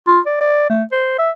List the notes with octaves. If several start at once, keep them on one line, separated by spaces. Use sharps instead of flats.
F4
D5
D5
A3
C5
E5